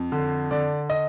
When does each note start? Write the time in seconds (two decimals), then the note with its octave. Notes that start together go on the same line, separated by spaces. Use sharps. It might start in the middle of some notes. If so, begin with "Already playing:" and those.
Already playing: F2
0.12 D3
0.51 D3 D5
0.90 D#5